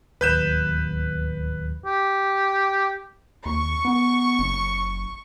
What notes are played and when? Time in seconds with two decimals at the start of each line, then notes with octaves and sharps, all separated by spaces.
0.21 D1 D#2 B4 G6 E7
1.84 G4
3.46 D#2 C#6
3.85 B3
4.39 F#1